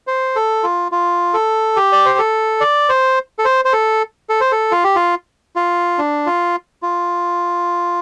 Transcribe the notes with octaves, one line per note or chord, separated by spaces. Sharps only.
C5
A4
F4
F4
A4
G4
D5
C5
A4
D5
C5
A4
C5
C5
A4
A4
C5
A4
F4
G4
F4
F4
D4
F4
F4